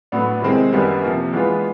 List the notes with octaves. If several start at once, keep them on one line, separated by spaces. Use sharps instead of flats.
A2 F#3 B3 D4
C3 D#3 G#3 C4 E4
F#2 D#3 G3 B3 D4
C3 F3 A#3
E3 G#3 B3 D4 F4